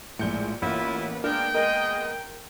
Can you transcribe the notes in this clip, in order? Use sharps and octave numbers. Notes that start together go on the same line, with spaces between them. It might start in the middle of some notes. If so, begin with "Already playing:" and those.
A#1 A2 G#3 G6 C#7
A1 A#3 B3 E4 F4 B4
G#3 D4 F4 A#4 G5
G#3 A#4 D#5